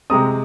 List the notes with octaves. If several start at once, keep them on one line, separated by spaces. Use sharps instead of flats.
C3 G#3 C4 A#5 D#6